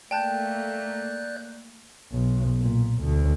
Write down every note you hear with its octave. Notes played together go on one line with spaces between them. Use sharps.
A3 A#3 D5 G5 A5 F#6 G6
B1
A#2
D2